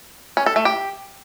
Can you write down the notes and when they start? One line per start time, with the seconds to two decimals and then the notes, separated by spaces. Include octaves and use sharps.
0.37 C#4
0.46 A4
0.56 A3
0.65 G4